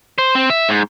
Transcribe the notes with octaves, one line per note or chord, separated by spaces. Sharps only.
C5
C4
E5
G#2